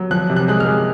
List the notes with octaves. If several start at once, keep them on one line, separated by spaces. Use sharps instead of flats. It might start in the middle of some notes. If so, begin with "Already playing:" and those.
Already playing: F#3
F3 F#6
C3
F#6
G#3 F#6
F6
G#3